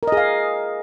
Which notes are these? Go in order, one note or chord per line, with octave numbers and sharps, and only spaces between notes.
G#4 A#4 D#5 F5